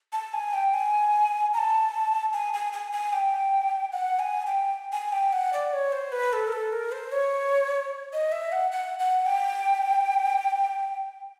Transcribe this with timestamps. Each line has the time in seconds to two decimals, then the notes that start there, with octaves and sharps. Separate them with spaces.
0.13 A5
0.34 G#5
0.53 G5
0.74 G#5
1.54 A#5
1.58 A5
2.33 G#5
2.53 G#5
2.73 G#5
2.92 G#5
3.13 G5
3.92 F#5
4.19 G#5
4.47 G5
4.92 G#5
5.12 G5
5.32 F#5
5.53 D5
5.73 C#5
5.92 C5
6.12 B4
6.33 A4
6.47 A#4
6.52 A4
6.72 A#4
6.92 C5
7.12 C#5
8.13 D#5
8.32 E5
8.52 F#5
8.72 F#5
8.99 F#5
9.26 G5